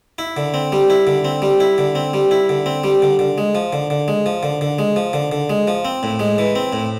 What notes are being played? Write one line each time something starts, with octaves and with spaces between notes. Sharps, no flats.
E4
D3
C4
G3
E4
D3
C4
G3
E4
D3
C4
G3
E4
D3
C4
G3
D3
D3
G#3
F3
D3
D3
G#3
F3
D3
D3
G#3
F3
D3
D3
G#3
F3
C4
A2
G#3
E3
C4
A2